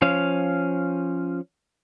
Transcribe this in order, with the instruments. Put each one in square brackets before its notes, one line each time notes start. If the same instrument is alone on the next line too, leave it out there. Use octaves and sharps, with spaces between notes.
[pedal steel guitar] F3 C#4 F5